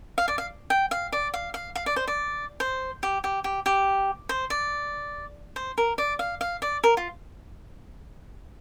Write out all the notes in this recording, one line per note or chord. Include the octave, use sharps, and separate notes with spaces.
F5
D5
F5
G5
F5
D5
F5
F5
F5
D5
C5
D5
C5
G4
G4
G4
G4
C5
D5
C5
A#4
D5
F5
F5
D5
A#4
F4